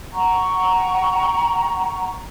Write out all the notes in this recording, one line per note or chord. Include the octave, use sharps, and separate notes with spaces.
F#5 G5 A#5 C#6